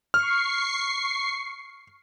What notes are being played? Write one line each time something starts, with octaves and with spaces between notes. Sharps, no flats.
C#6 F6 C7